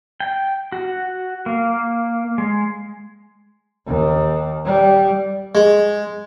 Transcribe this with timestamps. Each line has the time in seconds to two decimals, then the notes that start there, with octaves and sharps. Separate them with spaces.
0.20 G5
0.72 F#4
1.46 A#3
2.38 G#3
3.87 D#2
4.65 G3
5.55 G#3